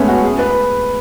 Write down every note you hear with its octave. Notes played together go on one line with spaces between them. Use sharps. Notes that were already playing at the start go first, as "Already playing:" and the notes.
Already playing: G#3 A3 B3 C#4
F#4
G#4
B4